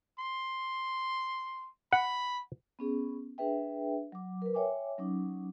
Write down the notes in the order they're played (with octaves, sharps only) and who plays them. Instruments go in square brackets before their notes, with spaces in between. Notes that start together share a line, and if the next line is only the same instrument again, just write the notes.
[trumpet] C6
[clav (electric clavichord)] F#5 [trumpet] B5
[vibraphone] B3 C#4 G#4
D4 G#4 B4 E5 G5
F#3 D6
A#4 B4
C#5 E5 G5 G#5 D6
F#3 C#4 D#4 D6